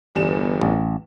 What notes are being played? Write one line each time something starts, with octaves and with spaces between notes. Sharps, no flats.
G1 E2 G3 E7
A1